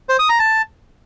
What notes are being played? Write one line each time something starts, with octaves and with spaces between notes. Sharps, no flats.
C5
D#6
A#5
A5